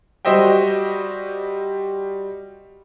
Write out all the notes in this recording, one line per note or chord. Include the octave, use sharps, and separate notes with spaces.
G3 F#4 C5 D#5 E5 G5